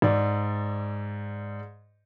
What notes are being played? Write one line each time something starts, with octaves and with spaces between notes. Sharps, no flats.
G#2 D5